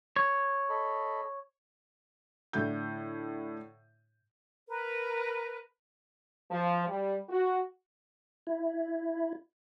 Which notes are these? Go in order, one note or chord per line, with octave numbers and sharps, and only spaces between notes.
C#5
A4 D#5 B5
A2 D3 E4 G6
A#4 B4
F3
G3
F#4
E4